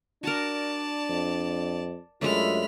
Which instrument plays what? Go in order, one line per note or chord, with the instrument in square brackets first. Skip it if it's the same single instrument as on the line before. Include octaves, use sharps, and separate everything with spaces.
[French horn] D4 [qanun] F#4 A#4 [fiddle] D5 A5
[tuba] F2
[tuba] F#2 [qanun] G#3 A3 D4 [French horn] F4 [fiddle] B5 F6